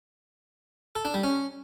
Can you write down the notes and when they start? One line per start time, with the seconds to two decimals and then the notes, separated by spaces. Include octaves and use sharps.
0.95 A4
1.05 D4
1.14 G3
1.24 C#4